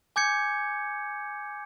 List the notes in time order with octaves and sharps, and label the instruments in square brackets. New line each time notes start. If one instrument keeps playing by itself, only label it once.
[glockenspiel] G#5 D6 G6 G#6 C#7